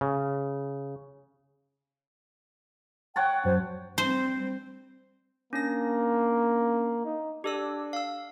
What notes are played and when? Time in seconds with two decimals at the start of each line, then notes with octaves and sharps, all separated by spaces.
0.01 C#3
3.16 C#5 F#5 G5 A5
3.45 F#2 F#3 C5
3.98 G3 C4 C5
5.53 A#3 C#4 D4 A#6
7.05 D#4
7.44 D4 G4 A4 E6
7.93 F5 E6